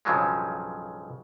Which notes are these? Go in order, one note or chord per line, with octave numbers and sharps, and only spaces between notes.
B1 G2 C#3 F3 F#3 G#3